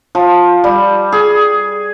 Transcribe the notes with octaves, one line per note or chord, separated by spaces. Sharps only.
F3
G3
G#4